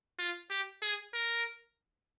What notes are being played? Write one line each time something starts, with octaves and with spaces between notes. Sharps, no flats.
F4
G4
G#4
A#4